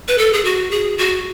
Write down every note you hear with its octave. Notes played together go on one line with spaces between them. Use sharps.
B4
A4
G#4
F#4
G#4
F#4